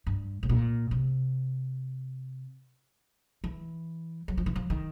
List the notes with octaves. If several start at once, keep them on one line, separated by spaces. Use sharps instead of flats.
G2
A2
A#2
C3
E3
F#3
F3
E3
F3
D#3